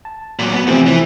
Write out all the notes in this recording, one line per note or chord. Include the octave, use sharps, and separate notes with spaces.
A5
A#2 F#3
B3
E2 C3 F3 A3 C4
E3